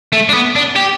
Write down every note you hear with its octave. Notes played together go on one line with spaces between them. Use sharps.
A3
D4
B3
D4
G4